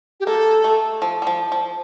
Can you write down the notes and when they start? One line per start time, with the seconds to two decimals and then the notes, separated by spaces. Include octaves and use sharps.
0.20 G4
0.26 A#3 A4
0.64 A3
1.02 F3
1.22 G3
1.27 F3
1.52 F3